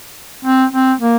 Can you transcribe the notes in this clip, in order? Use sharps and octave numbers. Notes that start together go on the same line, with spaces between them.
C4
C4
A#3